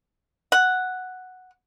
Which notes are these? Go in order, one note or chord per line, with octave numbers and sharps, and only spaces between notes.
F#5